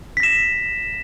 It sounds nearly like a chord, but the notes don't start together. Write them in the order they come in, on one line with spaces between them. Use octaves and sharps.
B6 A#6 E7